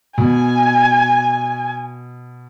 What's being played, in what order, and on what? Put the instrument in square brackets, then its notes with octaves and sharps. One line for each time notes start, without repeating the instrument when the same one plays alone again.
[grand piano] B2 [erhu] G#5